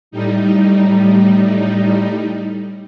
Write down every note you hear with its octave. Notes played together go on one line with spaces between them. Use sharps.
A2 G3 D#4